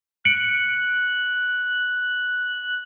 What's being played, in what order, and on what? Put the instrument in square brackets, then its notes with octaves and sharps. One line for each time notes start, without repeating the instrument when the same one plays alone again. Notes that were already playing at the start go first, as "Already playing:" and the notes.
[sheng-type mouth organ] F#6 [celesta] C#7 D7 F#7